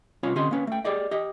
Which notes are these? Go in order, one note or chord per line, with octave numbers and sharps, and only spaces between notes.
C2 C#4 F4 C#5 B5
D3 C4 C#4 G4 D#5 C6
A#3 C#4 B4
A3 G5
G4 G#4 D5 D#5
G4 D#5